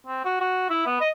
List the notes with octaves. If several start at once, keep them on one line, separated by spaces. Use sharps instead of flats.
C4
F#4
F#4
E4
B3
D#5